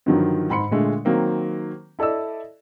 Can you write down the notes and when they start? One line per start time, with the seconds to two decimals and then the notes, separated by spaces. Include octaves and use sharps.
0.06 G2 D3 D#3 F3 F#3
0.50 G#2 B5 C6 C#7
0.71 A#2 D3 G#3 A3
1.05 D#3 F#3 A#3 C4
1.99 E4 A4 D5 D#5 E6